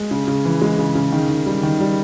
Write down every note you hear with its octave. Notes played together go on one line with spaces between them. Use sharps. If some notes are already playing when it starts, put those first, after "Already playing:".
Already playing: G#3
C#3
C#3
E3
G#3
C#3
C#3
D#3
D#3
G3
D#3
G3